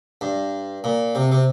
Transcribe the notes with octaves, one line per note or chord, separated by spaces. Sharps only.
G2
A#2
C3
C3